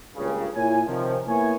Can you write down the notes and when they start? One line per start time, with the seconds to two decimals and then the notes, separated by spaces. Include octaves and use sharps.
0.16 C#2 G2 A#2 C#3
0.54 A#2 E4 C#5 G#5
0.87 C3 D#3 F3
1.27 A#3 B3 E4 C#5 G#5